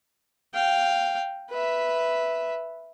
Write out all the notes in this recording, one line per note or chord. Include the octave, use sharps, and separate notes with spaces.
F5 G5
B4 E5